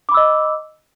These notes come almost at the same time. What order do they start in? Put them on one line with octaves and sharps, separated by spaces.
D6 B5 E6 D#5